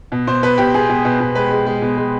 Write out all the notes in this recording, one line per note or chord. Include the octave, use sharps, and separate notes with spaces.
B2
B2 C5
B2 B4
B2 G4
B2 G#4
B2
B2
B2
G#3 B4
G#3
G#3
B2
G#3